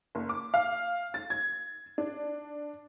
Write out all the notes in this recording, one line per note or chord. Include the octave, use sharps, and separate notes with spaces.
F#1
D6
F5
A6
G#6
D4